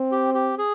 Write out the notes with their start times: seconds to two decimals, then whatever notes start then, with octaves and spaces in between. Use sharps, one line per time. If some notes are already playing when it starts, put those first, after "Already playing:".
Already playing: C4
0.12 G4
0.34 G4
0.58 G#4